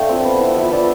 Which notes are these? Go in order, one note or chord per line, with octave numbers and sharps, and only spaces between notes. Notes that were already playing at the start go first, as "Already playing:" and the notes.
Already playing: A3 D4 F5 G5
C4 F4
B3
E4
F3 E5
B3 D4 F4